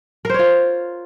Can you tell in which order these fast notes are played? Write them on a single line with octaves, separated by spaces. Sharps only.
A#4 C5 C#5 F4